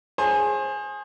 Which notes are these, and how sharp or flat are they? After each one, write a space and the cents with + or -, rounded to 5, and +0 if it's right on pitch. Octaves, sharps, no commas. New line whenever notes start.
G#4 +0 C5 +35 A5 +0